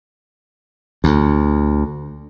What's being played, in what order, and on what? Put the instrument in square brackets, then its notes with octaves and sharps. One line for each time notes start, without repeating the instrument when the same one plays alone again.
[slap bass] D2